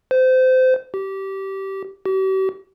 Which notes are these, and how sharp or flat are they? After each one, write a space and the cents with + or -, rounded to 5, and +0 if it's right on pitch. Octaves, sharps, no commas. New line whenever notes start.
C5 -25
G4 -20
G4 -45